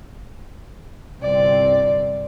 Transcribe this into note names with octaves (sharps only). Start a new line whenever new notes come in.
G1 C2 C4 D5